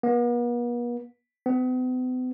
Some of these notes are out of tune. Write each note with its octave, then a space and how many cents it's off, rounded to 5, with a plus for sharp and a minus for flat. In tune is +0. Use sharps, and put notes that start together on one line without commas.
B3 -45
B3 +45